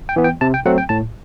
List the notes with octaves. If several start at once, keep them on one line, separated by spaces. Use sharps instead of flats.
G5
E3 B3
G5
C3 A5
G5
F#3 A3 C4 F#5
G5
A2 A5